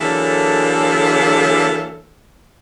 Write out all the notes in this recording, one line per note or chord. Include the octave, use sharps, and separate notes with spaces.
D3 E3 F#3 A#3 G#4 A4